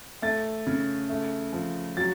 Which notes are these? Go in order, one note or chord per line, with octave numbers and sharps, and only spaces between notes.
A3 A6
C#3
A3
F3
F#3 A6